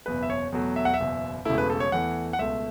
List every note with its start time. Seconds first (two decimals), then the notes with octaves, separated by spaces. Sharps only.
0.06 F#1 E2 B2 B4
0.23 E5
0.30 C#5
0.52 E2 B2 F#3 A3
0.76 E5
0.85 F#5
0.94 E5
0.99 F#1 E2 B2
1.45 E1 E2 C#3 A3 E4
1.58 B4
1.70 A4
1.80 C#5
1.92 E2 E3 A3 F#5
2.33 F#5
2.39 C#2 B2 A3 E5